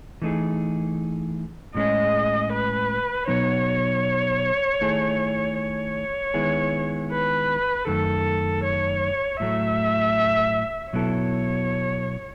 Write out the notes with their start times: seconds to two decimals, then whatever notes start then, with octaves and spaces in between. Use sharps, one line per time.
0.22 E3 A3 D#4 G#4
1.75 A2 G#3 C#4 G#4 D#5
2.52 B4
3.28 B2 F#3 B3 D#4 C#5
4.81 D#3 A3 E4 G#4
5.58 C#5
6.34 D#3 G#3 B3 E4 G#4
7.11 B4
7.87 F#2 D#3 A3 A4
8.64 C#5
9.40 A2 F#3 A3 E5
10.93 B2 F#3 B3 E4 A4 C#5